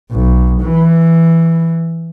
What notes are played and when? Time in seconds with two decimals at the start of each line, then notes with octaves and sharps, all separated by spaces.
0.11 B1
0.62 E3